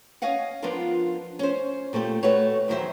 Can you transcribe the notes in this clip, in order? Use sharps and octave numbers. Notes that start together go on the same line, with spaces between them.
C#4 C#5 D#5 F5 F#5
F3 B3 D4 D#4 F4 A#4
C#4 C5
A#2 A3 C4 G4
A3 F#4 B4 C#5
E2 D#3 F#3 F4 C5 E5